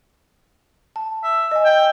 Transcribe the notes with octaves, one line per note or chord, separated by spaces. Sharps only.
A5
E5
D#5 G#5
G5